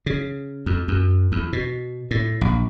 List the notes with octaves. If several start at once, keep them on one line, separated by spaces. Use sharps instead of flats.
C#3
F2
F#2
E2
B2
A2
A#1